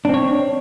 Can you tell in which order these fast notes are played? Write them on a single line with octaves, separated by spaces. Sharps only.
D4 C4 C#5